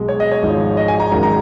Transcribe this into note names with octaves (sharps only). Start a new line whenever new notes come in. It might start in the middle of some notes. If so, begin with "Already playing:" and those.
Already playing: B1 B2 G#3
C#5
D#5
C#5
G#1 G#2 F3 G#3
D#5
G#5
A#5
G#1 F#2 D#3 G#3 A#5
A#5